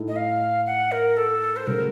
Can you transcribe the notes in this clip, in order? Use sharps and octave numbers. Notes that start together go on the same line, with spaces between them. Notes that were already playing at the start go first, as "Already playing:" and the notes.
Already playing: A2 A3 D#4
D#5
F5
F#5
A#4
A4
C5
C#3 F#3 A3 C#4 A#4